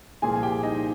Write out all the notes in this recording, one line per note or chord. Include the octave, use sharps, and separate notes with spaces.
C2 A#2 F3 A#3 F4 G#4 G#5
G#5
G4 G5
D#4 D#5